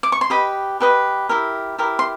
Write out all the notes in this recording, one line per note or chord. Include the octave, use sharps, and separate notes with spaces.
D6
C#6
C6
G4 B4 D#5 B5
G4 B4 D#5
E4 G4 A#4
E4 G4 A#4
C6